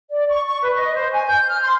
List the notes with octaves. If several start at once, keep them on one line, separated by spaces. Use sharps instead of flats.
D5
C#6
C#6
B4
D#5
C5
G#5
G6
F6
C6